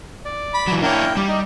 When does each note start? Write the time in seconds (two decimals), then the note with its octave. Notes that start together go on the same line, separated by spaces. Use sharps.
0.25 D5
0.54 B5
0.67 E3 F#3
0.82 A#3 D4 E4 A#4 C#5 G5
1.17 G3 G4
1.28 D#4